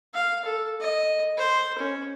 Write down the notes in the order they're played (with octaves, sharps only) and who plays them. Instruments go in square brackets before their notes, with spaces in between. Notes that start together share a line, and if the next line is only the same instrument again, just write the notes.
[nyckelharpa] F5
A4
D#5
C5
C#4